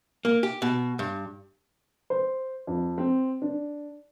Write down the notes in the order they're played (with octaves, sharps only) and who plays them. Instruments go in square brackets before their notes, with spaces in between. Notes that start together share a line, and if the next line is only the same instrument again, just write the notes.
[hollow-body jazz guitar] A#3
G4
B2
G2
[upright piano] C5
F2
C4
D4